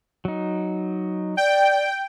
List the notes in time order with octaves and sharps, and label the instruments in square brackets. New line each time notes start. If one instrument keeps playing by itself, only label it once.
[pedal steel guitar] F#3 D#4
[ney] D5 [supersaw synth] G5